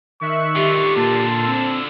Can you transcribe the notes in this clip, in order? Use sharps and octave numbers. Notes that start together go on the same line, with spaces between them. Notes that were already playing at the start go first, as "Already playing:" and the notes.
D#3 E5 C#6 F#6
D3 F4 G4
A#2 A5 C6
C4 E6